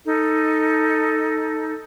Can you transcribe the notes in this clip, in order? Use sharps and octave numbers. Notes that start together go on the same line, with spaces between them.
D#4 A4